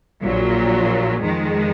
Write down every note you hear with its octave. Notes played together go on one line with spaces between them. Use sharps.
A#1 A#2 F#3
F2 D#3 G#3